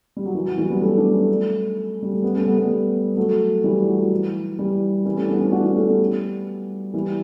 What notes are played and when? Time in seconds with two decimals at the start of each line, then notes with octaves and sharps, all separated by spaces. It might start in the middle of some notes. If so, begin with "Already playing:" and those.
0.16 G3
0.26 F#3
0.35 E3
0.46 F#3
0.58 E3 G3
0.70 G3 B3
0.81 A3 C#4
0.97 B3 D4
1.13 A3 C#4
2.02 G3
2.12 A3
2.22 G3 B3
2.35 A3 C#4
2.46 G3 B3
2.58 G3 B3
3.17 F#3 A3
3.64 E3 G3
3.87 F#3 A3
3.99 F#3
4.11 E3
4.58 E3 G3
5.05 E3 G3
5.17 A3 C#4
5.29 B3 D4
5.40 C#4 E4
5.52 D4 F#4
5.64 B3 D4
5.76 A3 C#4
5.88 G3 B3
6.94 E3 G3